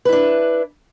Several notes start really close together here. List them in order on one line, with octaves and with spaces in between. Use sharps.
B4 E4 D4